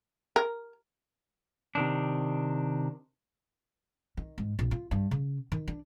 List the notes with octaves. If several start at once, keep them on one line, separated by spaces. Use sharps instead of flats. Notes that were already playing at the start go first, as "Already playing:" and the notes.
A#4
C3 D#3 D4
D#3
G#2
A#1
F4
G2
C#3
D#3
D4